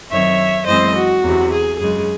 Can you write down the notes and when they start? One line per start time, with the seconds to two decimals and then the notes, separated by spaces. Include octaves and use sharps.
0.11 F#2 D#3 F#3 C4 C#5 E5
0.67 F#2 E3 G#3 C4 C5 D#5
0.95 F#4
1.23 E2 C3 F#3
1.52 G#4
1.79 F#2 C#3 G#3 G#4